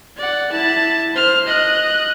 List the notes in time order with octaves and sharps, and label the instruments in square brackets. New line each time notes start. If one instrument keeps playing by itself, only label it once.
[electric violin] D5 F#5
E4 A5
C5 F6
D#5 F#6